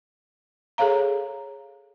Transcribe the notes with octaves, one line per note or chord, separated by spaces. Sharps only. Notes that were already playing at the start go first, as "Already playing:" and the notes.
G#4 A4 C#5 F5 A#5